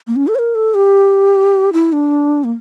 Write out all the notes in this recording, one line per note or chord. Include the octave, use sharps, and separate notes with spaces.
A#3
C#4
A4
C#5
A#4
A4
G4
E4
D4
A#3